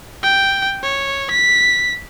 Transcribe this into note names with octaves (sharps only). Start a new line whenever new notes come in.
G5
C#5
B6